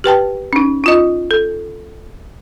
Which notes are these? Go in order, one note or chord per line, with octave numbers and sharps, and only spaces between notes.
G4 B4 G5 A5
C#4 D#4
D#4 F4 D#5
A4